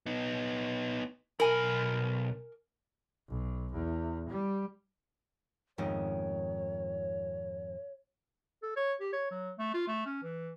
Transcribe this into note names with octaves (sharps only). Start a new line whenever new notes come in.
B3 D#4
B1 A#4 G#5 B5
B1
E2
G3
F2 G#2 D#3 C#5
A4
C#5
G4
C#5
F#3
A3
F4
A3
C#4
E3